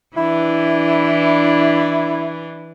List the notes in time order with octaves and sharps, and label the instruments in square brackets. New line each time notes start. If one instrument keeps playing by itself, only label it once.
[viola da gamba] E3 D4 [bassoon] E4